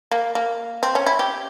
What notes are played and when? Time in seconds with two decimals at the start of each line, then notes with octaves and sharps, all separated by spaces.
0.12 A#3
0.35 A#3
0.83 C4
0.95 C#4
1.06 E4
1.19 G4